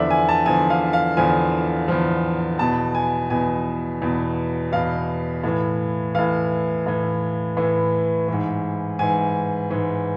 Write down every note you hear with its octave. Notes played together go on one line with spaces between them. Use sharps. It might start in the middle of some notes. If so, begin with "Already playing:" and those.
Already playing: E2 D3 F3 D5 E5
G#5
A5
E2 D3 F3 G#5
F5
F5
E2 D3 F3 G#5
E2 D3 F3
E2 B2 A5
G#5
E2 B2 G#5
E2 B2
E2 B2 F5
A2 E3
A2 E3 F5
A2 E3
A2 E3
G#2 E3
G#2 E3 G#5
G#2 E3